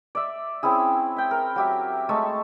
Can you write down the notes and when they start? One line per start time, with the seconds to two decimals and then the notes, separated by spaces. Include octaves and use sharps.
0.15 D5 E5
0.63 C4 C#4 E4 G#4
1.16 E5 G5
1.31 A#4
1.56 F#3 G4 E5
2.09 G#3 A3 A5 C#6